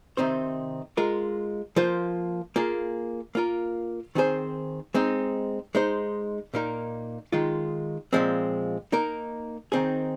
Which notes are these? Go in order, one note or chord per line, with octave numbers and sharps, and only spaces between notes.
C3 D#3 C4 D#4 C5
G#3 F4 A#4
F3 A#3 F4 C5
A#3 F4 G#4
A#3 F4 A#4
D#3 C4 G#4 C5
G#3 C4 D#4
G#3 D#4 C5
A#2 A#3 D#4 A#4
D#3 G#3 F4
A#2 F3 G#3 C4
A#3 D#4 A#4
D#3 C4 D#4 G#4